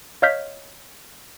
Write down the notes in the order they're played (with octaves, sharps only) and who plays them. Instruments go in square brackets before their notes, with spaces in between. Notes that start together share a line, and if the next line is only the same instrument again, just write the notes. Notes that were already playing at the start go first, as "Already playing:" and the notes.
[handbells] C#5 D#5 F5 F6 G6 B6